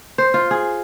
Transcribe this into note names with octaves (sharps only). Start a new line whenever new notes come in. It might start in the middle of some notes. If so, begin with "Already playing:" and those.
C5
F4
G#4